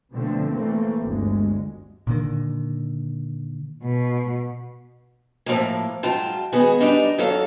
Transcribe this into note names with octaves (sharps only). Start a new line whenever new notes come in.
B2 D3 F3 A3 C4
E3 A3 A#3 C4
G1 D2 G#3
A#2 D3 D#3
B2
A2 F3 G#3 A#3
G#2 F#3 F4 G5 A5
D#3 G#3 B3 F#4 G#4
G3 D4 D#4
F2 F#3 A4 F5